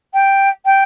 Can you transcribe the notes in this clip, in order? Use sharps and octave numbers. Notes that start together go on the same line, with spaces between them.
G5
G5